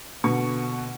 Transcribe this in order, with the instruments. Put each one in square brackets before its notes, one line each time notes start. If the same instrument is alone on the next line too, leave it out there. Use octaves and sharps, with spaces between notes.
[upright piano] B2 D3 C#6